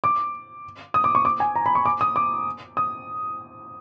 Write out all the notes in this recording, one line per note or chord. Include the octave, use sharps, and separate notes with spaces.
D6
D#6
D6
C#6
D6
G#5
A#5
B5
C#6
D6
D#6
D6
D#6